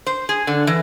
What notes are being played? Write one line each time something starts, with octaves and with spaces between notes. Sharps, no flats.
C5
G#4
D3
E3